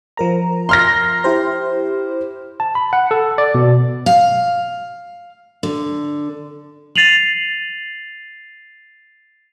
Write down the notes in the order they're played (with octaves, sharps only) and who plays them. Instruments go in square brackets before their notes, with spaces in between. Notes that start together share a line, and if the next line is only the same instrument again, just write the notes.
[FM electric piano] F3 A#4 A#5
[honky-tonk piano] C6 F6 A#6
[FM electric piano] E4 G4 C5
[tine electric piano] A5
B5
F#5
A4
D5
B2
[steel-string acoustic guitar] F5
D3
[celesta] A6 C7 D#7 F7 F#7